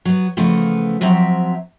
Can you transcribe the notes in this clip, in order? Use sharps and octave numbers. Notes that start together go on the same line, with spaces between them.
F#3 B3
C#3 E3 F3 A3 B3
F3 F#3 C4 E5 A#5